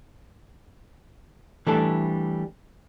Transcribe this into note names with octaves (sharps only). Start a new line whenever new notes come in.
E3 G3 A3 D4 A4